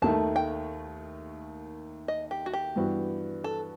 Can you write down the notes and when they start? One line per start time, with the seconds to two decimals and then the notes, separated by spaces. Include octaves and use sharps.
0.02 D#2 D#3 A3 A5
0.36 G5
2.08 D#5
2.31 G4
2.46 F#4
2.53 G4
2.76 G2 E3 B3 F#4
3.44 A4